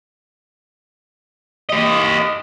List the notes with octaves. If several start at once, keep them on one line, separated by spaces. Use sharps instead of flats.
G4 D#5